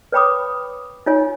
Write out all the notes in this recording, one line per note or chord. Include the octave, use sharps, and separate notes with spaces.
B4 C#5 G5 B5 D6 D#6
D#4 F4 C#5 G#5